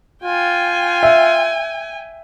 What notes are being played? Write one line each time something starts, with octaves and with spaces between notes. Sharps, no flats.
F4 G5 G#5
E5